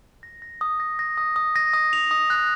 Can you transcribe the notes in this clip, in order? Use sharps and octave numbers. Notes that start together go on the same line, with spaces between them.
A#6
A#6
D#6
A#6
A#6
D#6
D#6
A#6
D#6
F7
D#6
F#6